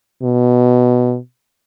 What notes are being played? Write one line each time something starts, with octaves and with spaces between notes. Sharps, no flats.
B2